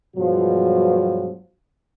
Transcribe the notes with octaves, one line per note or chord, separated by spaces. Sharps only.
G2 B2 F3 F#3 G#3 F#4